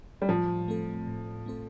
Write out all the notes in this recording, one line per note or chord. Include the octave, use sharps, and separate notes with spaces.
G3
A2 F3
A3 C4 A4
A2
A3 C4 A4